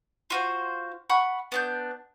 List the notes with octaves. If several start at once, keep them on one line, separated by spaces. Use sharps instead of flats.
F4 F#4 C5
F#5 B5 C#6
B3 D4 G6